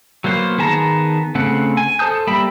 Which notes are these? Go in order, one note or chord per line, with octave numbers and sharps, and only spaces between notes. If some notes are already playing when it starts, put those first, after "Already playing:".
F#3 A#3 B3 C5
D#3 B3 G#4 A5 A#5
C#3 A3 C4 F#5
G#5
A4 C5 A5 D#6 G6
G3 A#3 E5 G5 B5